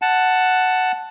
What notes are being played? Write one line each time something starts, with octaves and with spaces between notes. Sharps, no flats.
F#5 A5